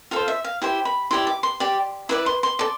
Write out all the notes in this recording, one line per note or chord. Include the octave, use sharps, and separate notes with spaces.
F4 A4 C5 F5
E5
F5
E4 G4 C5
B5
E4 G4 D5 C6
D6
C6
G4 D5
E4 B4 D5 B5
C6
C6
A4 D5